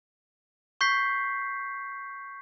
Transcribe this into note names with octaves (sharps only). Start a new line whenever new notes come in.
C#6 G6 B6 C7